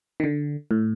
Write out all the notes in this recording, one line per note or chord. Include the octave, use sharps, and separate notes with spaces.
D#3
D3
A2